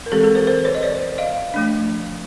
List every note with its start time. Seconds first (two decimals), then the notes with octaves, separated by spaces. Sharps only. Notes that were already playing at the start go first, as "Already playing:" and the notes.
0.06 A#4
0.12 E3 G#3 C4 G4 A4
0.23 G#4 A#4
0.35 A#4 C5
0.47 A#4 C5
0.65 B4 C#5
0.75 D#5
0.83 C5 D5
1.18 D#5 F5
1.54 F3 A3 D4